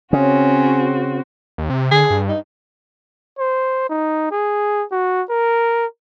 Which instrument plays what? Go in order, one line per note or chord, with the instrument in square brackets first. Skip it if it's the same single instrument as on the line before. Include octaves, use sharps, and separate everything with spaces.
[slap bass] C#3 [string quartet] C4 F#4 [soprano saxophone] C#4
[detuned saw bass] D#2
C3
[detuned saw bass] D3 [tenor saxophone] G#4
[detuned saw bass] G2
[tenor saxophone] D#4
[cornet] C5
D#4
G#4
F#4
A#4